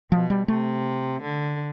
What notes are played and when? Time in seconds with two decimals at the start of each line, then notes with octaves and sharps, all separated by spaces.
0.12 B2 F3
0.30 G3
0.48 C3 A3
1.22 D3